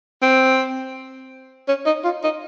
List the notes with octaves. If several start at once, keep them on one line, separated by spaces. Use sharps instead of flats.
C4
C#4
D#4
F4
D#4